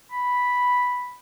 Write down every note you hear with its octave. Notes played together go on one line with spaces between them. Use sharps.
B5